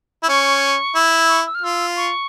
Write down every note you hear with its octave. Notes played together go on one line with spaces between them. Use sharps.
E4
C#4 C#6
E4
C#6
E6
F6
F4 E6
C#6